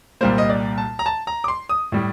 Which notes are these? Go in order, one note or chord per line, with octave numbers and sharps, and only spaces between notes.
C2 A#2 G3 A#3 C5
D#5
D5
A5
A#5
A5
A#5
D6
C6
D#6
A2 G3